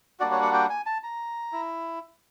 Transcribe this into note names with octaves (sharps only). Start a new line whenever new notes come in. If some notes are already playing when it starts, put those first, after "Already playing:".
G3 A#3 D4 F#4 D5
C#5
F#5
G5
G#5
A5
A#5
E4